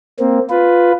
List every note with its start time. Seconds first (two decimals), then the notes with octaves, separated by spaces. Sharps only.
0.20 A#3 C4
0.50 F4 B4